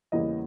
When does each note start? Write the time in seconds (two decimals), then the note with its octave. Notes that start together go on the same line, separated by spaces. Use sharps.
0.12 E2 C#3 E3 G3 A#3 D#5